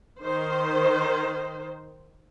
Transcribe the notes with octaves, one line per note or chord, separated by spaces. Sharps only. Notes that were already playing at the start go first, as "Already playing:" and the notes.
D#3 C5